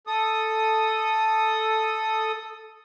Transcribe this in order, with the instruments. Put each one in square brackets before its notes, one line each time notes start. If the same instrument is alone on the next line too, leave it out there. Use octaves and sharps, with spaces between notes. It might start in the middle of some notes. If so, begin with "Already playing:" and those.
[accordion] A4 D#6